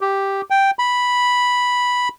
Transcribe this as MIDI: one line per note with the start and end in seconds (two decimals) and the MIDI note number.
0.01 0.42 67
0.50 0.71 79
0.79 2.09 83